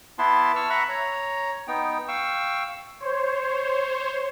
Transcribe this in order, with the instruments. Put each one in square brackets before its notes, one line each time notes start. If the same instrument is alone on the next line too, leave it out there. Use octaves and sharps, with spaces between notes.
[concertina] B3 E4 B4 A5 C6
A5 C#6 E6 F6
E5 F#5 A#5 B5 C#6 F#6
C#5 A#5
B3 D#4 G5
F5 G5 C#6 E6
[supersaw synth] C5 C#5